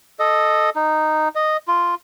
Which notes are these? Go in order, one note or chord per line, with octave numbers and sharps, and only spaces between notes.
A4 D#5
D#4
D#5
F4